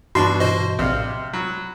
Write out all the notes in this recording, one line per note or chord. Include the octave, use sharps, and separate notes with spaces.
G2 B2 E3 D4 F#4 C6 C#6
B2 F#4 C5 D#5
A#1 A2 C3 D5 D#5 F5
F#3 B5